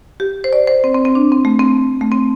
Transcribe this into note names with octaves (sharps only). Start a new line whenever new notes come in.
G4
C5
D5
C5
C4
C4
C4
D4
C4
A3
C4
A3
C4